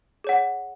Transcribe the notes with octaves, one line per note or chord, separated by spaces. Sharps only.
G#4 C#5 F#5